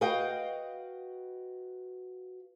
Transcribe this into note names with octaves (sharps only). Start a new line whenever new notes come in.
F#4 B4 D#5 F5 G5